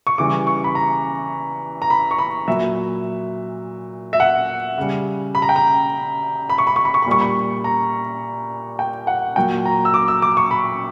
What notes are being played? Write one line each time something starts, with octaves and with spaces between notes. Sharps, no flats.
C#6
C#3 E3 G3 D6
C#6
B5
A#5
A#5
B5
C#6
B5
A#2 F#3 E5
E5
F#5
C#3 G3
B5
A#5
G5
A#5
B5
C#6
B5
C#6
B5
C#6
B5
A#2 G3 C#6
B5
A#5
G5
F#5
A#2 F#3 G5
A#5
E6
D6
E6
D6
C#6
B5